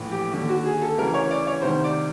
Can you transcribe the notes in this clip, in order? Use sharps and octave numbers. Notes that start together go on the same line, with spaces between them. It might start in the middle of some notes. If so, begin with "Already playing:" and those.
Already playing: A#1 A2 E3
G4
D#2 D3 G4
F#4
G#4
A4
D2 C#3 E3 A#4
C#5
D5
C#5
D2 C3 D#3 C5
D5